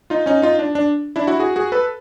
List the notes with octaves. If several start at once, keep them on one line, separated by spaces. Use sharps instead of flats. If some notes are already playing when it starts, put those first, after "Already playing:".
D#4 F4
C#4 D#4
D#4 F4
D4
D4
D4 E4
E4 F#4
F#4 G#4
F#4 G#4
A4 B4